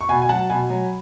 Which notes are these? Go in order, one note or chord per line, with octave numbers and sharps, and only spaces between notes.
C#6
B2 G#5 B5
G#5
F#3 F#5 A5
B2 G#5 B5
F#3